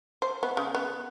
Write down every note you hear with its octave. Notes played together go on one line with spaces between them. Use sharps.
C5
B3
C#3
B3